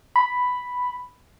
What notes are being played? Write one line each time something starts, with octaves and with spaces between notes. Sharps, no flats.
B5